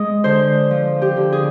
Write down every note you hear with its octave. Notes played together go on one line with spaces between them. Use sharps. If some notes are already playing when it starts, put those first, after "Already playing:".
Already playing: G#3 D#5
D3 C5
F3
G4
D3
G#4